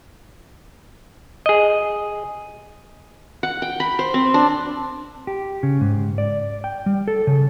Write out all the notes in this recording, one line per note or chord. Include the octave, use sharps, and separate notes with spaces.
G#4 D#5
F#5
G5
B5
C5
C4
D4
G4
C#3
G#2
D5
G5
G3
A4
C#3